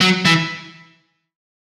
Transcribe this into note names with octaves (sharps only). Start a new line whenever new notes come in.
F#3
E3